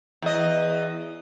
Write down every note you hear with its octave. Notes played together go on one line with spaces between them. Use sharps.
E2 D#5